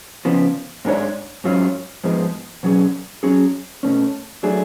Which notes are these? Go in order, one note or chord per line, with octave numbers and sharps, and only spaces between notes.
C#3 F3 B3
G#2 G#3 D4 G#4 C#5
G#2 F#3 C#4 F4
G#2 F3 G#3 B3
B2 F#3 C#4 G#4
F#3 C#4 G#4
B2 A3 C#4
F#3 A3 D4 G#4